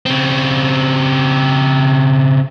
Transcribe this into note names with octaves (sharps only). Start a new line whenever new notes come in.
C#3 C4